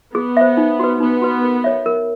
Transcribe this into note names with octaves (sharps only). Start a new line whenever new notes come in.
B3 G#4
C5 E5
D#4
F#4 B4
B3 D#4
F#4 B4
A#4
C#5 E5
A#4